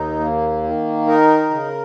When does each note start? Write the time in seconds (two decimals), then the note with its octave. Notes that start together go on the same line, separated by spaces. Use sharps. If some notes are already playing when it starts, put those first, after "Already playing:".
Already playing: D#2 D#4
0.19 A#3
0.63 D#3
1.07 D#4 A#4
1.51 C#3